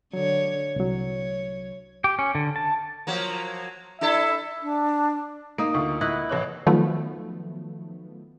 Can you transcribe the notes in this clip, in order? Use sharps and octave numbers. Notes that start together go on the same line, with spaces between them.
D3 F#3 C#5
C2 F#3 C#5
G4
C#4
D3
A5
F3 F#3 A#3
D4 E4 A4 E5
D4
A#3 D#4 D#6 D7
D2 F4 C#6
E4 D#5 F#5
A1 C#5 F#6
D#3 F3 F#3 A3 B3